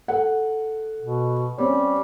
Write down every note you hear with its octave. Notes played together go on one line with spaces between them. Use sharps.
A4 F#5
B2
G3 C4 C#4 C#5